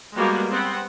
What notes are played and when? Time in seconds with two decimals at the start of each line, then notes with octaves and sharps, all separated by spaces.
0.14 G3 G#3 A#3 B3 F#4
0.50 B3 C4 F#5